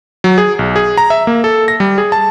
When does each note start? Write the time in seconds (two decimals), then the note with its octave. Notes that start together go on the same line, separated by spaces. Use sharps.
0.24 F#3
0.38 G#4
0.59 B1
0.76 G#4
0.98 A#5
1.10 E5
1.27 A#3
1.44 A4
1.68 A#6
1.80 G3
1.98 G#4
2.12 A5